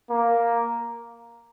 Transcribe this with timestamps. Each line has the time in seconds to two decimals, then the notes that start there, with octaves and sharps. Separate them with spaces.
0.10 A#3